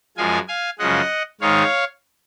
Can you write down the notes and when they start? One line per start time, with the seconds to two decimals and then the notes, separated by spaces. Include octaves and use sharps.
0.17 F#2 F3 G#3 F5 G#5
0.48 F5 G#5
0.79 F#2 C#3 F3 G#3 D#5 F#5
1.41 G#2 D#3 G#3 C#5 F5